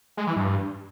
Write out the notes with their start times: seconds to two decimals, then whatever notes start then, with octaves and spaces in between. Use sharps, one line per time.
0.17 G#3
0.27 E3
0.36 G2